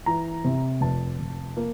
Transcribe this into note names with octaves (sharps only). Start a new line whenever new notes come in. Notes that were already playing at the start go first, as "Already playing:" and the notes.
E3 A#5
C3
F1 A5
F1
A#3